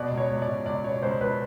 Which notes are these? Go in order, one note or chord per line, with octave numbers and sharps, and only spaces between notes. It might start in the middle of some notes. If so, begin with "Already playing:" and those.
Already playing: B2 D5
C#2
C#5
C#2
D5
B2
C#2 D5
B2 C#5
C#2 C5
C#2 B4